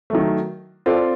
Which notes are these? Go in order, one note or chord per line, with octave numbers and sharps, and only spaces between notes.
D#3 F#3 A3
C4 F4 A4 D5